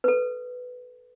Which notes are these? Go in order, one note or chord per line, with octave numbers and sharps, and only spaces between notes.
A4 B4